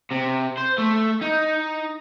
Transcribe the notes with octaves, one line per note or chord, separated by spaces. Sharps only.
C3
C5
A3
D#4